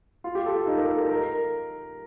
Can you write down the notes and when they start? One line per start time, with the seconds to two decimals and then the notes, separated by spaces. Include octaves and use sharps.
0.24 F4
0.35 G4
0.46 A4
0.56 F4
0.67 D#4
0.78 A#4
0.88 A4
0.99 A#4
1.09 A#4